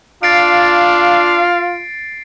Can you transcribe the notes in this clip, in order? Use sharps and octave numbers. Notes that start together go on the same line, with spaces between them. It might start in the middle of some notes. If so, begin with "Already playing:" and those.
D4 F4 F5 A6 C7 D7